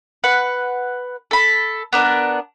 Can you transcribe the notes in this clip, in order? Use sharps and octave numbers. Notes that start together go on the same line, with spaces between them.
B4 F#5
A4 B5
B3 D4 A#4